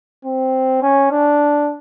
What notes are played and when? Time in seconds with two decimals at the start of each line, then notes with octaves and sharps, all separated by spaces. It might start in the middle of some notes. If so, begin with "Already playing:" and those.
0.25 C4
0.82 C#4
1.11 D4